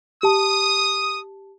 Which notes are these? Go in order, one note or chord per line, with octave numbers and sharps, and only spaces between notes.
G4 A5 D#6